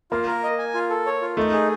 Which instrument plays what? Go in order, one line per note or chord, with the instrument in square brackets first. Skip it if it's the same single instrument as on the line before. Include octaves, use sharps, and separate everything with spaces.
[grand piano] A#3 [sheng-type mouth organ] F4
[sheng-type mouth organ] A#4
D#5
G#5
F4
A4
C#5
F4
[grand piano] A3 [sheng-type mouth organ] D#4
[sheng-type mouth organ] G#4